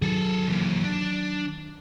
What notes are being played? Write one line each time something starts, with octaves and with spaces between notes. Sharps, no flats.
D#3 F#3 G#4 A4
E3 A#3
D4